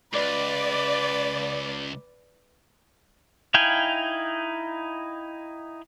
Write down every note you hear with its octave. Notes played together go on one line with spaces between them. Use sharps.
C#2 B4 D5
D#4 E4 F5 G5 G#5